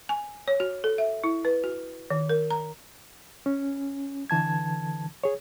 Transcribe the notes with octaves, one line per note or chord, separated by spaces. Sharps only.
G#5
C#5
F#4
A4
E5
E4
B4
F#4
D#3
A#4
A#5
C#4
D3 E3 A5 G#6
G#4 C#5